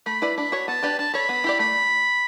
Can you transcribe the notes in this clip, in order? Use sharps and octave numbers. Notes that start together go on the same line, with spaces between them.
A3 B5
E4 B4 D5
D4 B5
F#4 C#5
B3 A5
D4 G4 B4 D5
D4 A5
A4 C#5 B5
B3
E4 G4 D5
A3 B5